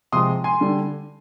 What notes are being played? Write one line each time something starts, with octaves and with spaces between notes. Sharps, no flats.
C3 F3 G#3 C6 D#6
G#5 C6
D3 G3